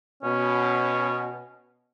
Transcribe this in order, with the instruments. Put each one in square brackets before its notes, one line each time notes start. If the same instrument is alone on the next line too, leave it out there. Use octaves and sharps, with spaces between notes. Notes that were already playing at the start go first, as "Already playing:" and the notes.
[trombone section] B2 [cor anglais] C#4